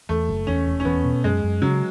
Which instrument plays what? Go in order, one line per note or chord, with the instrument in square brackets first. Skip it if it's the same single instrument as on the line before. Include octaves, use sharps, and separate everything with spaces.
[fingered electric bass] E2 [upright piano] A3
[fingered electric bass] F#1
[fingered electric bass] E2 [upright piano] C#4
[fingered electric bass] E1
[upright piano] C#4
[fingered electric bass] E2 [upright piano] B3
[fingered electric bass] B2
[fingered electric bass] F#2 [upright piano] G#3
[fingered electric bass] F#2
[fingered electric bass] C#3 [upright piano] F#3